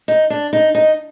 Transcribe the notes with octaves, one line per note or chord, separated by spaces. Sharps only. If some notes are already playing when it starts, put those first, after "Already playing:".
D#4
D4
D#4
D#4